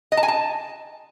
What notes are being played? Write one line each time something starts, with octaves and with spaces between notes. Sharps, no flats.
D#5
A5
G#5
A5